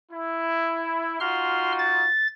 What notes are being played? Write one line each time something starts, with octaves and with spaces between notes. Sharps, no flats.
E4
D#4 F4 F#4 C6 F6
A6